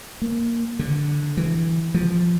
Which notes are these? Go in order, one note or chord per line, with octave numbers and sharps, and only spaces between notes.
A#3
D3
E3
F3